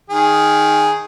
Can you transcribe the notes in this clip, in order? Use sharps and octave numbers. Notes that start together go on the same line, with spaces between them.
D#3 G#4